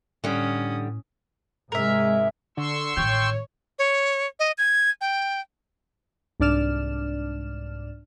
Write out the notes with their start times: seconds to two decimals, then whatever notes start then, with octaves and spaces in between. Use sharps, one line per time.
0.24 A2 D3 G3 C#4 D#6
1.72 G#2 C3 G#3 A#4 E5
2.57 D3 C6 C#6 E6
2.97 A1 D#3 C#5 G5
3.79 C#5
4.40 D#5
4.58 G#6
5.01 G5
6.40 C2 G#2 D4 D5 F6 E7